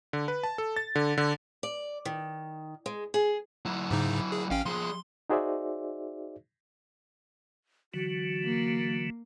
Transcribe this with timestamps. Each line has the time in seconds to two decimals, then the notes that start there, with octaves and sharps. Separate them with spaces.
0.13 D3
0.28 B4
0.43 A5
0.58 A4
0.76 A6
0.95 D3
1.18 D3
1.63 D5
2.05 D#3
2.86 G#3
3.14 G#4
3.65 F#3 E4
3.91 G#2 C#3 D#4
4.32 G#4
4.51 A1 C#4 F5 G5
4.66 F3 G#4 C6
5.30 D#4 F#4 G#4 C5 D5 E5
7.94 D3 E3 F#3 F#4
8.45 A#3